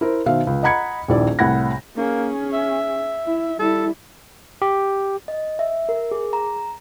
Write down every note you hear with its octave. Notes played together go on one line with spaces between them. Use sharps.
E4 A#4 C5
B2 D#3 C5 E5 F5
C#2
D#5 F#5 A#5 B5 G#6 C#7
D#1 A#1 D#3 E4 D5
C2 A2 F#5 B5 G#6 A#6
A#3 C#4 G#4
E5
E4
G3 E4 A4
G4
D#5
E5
A#4
G#4
A#5